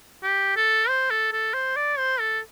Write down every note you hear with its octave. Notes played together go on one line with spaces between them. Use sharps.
G4
A4
C5
A4
A4
C5
D5
C5
A4